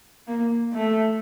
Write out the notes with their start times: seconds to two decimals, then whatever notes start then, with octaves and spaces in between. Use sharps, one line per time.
0.27 A#3
0.74 A3